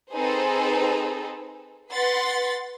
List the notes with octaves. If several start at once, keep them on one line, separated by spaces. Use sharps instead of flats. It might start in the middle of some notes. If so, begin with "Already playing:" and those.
C4 D#4 G#4 A4 B4 C5
B4 F#5 C6 A6 B6